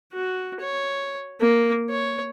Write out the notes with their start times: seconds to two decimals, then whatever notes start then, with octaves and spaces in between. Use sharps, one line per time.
0.14 F#4
0.60 C#5
1.41 A#3
1.90 C#5